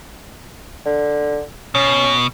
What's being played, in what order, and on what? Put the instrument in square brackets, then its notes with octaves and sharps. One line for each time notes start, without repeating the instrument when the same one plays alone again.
[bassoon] D3
[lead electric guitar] B2 [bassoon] C#4